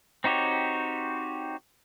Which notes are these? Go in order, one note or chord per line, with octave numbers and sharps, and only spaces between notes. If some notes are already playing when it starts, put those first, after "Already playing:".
C4 D#4 F#4 G4 C#5